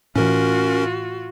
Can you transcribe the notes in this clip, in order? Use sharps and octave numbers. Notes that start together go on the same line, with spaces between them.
A2 E3 C#4 F4 F#4 A#4